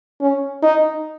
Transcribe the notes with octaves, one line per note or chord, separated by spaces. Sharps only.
C#4
D#4